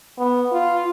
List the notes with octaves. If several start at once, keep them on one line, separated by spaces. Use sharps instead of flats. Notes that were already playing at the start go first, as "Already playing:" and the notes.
B3
F4